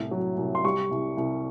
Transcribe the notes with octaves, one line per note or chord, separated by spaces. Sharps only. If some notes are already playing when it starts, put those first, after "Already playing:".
Already playing: C2 A2
F#3
C2
C6
G3 C#6
C2
C2